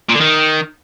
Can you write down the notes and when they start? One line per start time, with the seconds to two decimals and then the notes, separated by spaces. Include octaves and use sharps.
0.09 A#2
0.15 D3
0.21 D#3